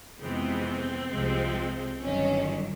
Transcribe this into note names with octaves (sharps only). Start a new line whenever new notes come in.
F2 C3 E3 G#3 B3 C4
C2 C3 F3 G#3
G1 G2 D#3 F#3 C#4